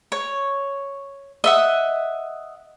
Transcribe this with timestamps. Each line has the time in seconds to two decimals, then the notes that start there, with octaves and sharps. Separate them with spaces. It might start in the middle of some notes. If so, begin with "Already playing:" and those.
0.12 C#5
1.44 D#5 E5 F#5